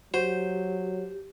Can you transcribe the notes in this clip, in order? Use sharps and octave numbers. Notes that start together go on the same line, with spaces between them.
F#3 F#4 G4 C5